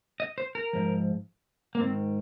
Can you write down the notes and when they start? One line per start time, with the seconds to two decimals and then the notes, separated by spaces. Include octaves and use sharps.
0.20 D#5
0.38 C5
0.55 A#4
0.73 G#2 F3
1.75 A#3
1.80 G#2 D#3 C4